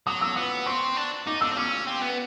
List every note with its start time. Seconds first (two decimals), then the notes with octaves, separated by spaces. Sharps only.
0.07 F#3 D#6
0.21 E6
0.36 B3 D#6
0.66 C4 C#6
0.96 D4
1.26 D#4 D6
1.41 D4 E6
1.51 C4
1.57 C#4 D6
1.87 C4
2.01 B3